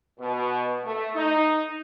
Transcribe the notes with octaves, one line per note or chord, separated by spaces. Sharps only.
B2
A3
D#4